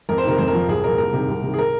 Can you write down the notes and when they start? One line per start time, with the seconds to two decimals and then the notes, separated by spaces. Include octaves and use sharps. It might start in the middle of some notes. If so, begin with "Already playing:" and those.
0.09 F2 A#4
0.18 C5
0.23 C3 D#3 A#4
0.38 F2 C5
0.48 A#4
0.53 F3
0.68 C2 G#4
0.84 A#2 F3 A#4
0.98 C2 A#4
1.13 C3 D#3
1.28 C2
1.43 C3 D#3
1.54 G#4
1.58 A#4